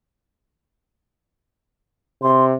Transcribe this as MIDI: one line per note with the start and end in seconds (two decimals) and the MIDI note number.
2.22 2.55 48
2.22 2.44 84